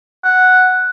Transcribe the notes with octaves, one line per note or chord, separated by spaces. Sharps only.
F#5